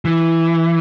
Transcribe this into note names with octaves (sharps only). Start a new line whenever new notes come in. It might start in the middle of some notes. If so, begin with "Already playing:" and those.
E3